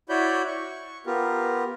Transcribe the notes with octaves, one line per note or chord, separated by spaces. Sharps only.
E4 F#4 C#5 D5 B5 G6
C#6
B3 F4 G4 A#4